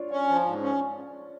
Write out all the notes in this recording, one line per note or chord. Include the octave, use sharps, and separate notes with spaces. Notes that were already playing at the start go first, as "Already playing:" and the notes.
Already playing: D4 F4 C#5
C#4
F3
G#2
C#4